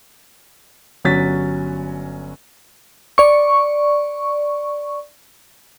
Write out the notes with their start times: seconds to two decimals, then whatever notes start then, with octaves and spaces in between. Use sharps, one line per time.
1.05 G1 F#3 C#4 A6 B6
3.18 D5 C#6